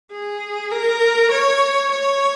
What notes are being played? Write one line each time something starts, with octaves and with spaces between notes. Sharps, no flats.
G#4
A#4
C#5
C#5